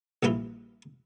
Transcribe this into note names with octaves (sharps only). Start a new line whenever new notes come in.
A#1 G2 E3 E4 F4